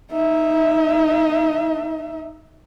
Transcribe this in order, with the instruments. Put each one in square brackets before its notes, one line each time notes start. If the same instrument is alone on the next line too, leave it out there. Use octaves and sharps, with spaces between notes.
[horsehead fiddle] D#4 E5